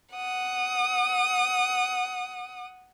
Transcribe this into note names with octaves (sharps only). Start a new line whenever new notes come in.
F#5 D#6